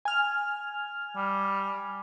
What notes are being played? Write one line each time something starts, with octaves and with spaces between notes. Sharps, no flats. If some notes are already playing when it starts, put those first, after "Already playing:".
G#5 F6
G3